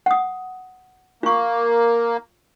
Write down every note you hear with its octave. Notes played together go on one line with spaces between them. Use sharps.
F#5 D#6
A#3 F4 C#6